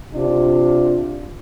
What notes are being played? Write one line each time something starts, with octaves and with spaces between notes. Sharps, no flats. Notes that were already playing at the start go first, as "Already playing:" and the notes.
C3 D4 F4